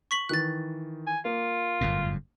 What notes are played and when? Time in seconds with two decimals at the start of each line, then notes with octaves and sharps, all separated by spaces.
0.11 C#6 B6 F#7
0.29 D#3 E3 F#6 A6
1.07 G#5
1.25 A#3 F4
1.81 G1 F#2 A2